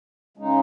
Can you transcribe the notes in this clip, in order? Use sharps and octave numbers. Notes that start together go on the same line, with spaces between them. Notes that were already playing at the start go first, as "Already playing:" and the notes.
C#3 G#3 D#4